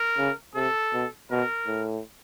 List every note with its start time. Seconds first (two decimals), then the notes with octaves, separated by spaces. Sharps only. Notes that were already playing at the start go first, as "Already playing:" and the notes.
Already playing: A#4
0.18 C#3
0.55 C3 A4
0.93 B2
1.31 B2 A#4
1.67 A2